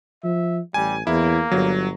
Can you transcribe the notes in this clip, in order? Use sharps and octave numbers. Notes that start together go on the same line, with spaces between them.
F3 E5
A1 G3 G#5
E2 A#3 E4
G1 F#3